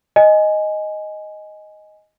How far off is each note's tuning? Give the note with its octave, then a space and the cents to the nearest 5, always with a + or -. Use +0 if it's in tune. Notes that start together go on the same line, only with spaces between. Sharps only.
D#5 +0 G#5 +5